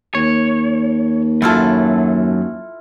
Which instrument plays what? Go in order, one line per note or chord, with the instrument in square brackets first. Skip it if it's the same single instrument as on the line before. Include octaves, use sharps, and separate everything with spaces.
[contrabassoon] D#2 [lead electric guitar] C#5
[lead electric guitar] F#2 F#3 [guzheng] E4 F4 A4